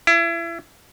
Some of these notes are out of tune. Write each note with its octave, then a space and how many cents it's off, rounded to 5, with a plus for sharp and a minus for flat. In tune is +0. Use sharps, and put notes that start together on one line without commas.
E4 +30